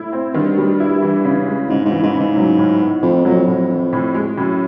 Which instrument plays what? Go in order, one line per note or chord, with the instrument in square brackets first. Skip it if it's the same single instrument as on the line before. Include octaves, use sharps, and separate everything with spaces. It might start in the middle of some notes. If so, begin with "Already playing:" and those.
Already playing: [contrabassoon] A2 [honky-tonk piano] E4
[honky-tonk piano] C4
[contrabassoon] G2 [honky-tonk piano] D#3
[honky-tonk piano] G3
E4
E3
C#3
G#3
[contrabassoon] G#2 [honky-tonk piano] C#3
[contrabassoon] G#2
[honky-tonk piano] E3
[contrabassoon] G#2
[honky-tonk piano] C#3
[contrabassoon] G#2
[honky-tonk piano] F#3
A2
B3
[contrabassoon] F2 [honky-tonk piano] A2
[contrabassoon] F2 [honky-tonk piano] F#3
[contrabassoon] F2 [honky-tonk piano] A2
[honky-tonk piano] E3
A2
G#3
[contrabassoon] F#2 [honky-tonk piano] A2